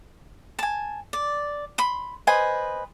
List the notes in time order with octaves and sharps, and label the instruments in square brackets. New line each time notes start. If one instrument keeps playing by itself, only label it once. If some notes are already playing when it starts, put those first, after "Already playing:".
[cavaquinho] G#5 A5
D5
B5 C6
B4 C5 D#5 G#5